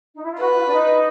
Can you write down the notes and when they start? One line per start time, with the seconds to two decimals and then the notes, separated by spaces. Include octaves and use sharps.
0.16 D#4
0.23 E4
0.31 F4
0.39 F#4 B4
0.55 F4
0.67 D4
0.71 D#4